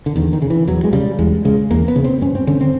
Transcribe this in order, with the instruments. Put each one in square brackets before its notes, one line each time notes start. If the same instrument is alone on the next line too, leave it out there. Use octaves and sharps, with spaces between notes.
[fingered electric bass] D3
E2 D#3
D#3
C#3
E3
E2 F#3
G#3
C#3 G3
E2 G#3
C#3 G#3
E2 A#3
B3
C#3
C4
G2 C#4
C4
D3 C#4
C4